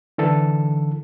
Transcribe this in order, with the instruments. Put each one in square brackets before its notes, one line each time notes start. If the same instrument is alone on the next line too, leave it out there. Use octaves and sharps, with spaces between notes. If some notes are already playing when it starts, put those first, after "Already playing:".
[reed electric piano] D3 E3 A4